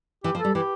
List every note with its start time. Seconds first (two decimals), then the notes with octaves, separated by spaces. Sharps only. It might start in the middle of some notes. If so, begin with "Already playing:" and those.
0.24 E3 G4
0.35 F3
0.40 G3 A4
0.55 E3 G4